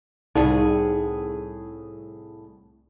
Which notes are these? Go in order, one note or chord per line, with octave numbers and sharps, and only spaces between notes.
C2 A2 D#4 G#4